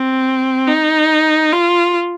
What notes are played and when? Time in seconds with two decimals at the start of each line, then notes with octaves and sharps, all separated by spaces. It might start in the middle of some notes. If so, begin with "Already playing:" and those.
Already playing: C4
0.68 D#4
1.52 F4